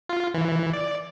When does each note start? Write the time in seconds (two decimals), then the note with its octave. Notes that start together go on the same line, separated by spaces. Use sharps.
0.09 F4
0.34 E3
0.73 D5